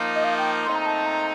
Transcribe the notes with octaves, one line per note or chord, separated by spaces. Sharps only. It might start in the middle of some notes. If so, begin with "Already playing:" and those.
Already playing: F3 A#3 D#4
D#5
F5
G5
A#2 A3 C4 D#4 C6
A#5
A5
A#5